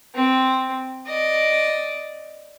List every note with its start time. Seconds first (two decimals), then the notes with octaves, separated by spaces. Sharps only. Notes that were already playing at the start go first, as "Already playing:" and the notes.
0.15 C4
1.06 D5 D#5